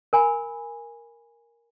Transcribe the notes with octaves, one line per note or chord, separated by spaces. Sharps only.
A#4 G#5 B5